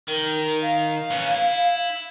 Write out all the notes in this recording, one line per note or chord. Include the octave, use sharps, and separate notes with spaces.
D#3 A#4
F5
E3 C#4
E4